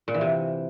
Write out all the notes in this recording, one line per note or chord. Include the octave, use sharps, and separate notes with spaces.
A#2
E3
C3